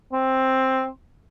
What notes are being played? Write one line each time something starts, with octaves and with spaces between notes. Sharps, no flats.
C4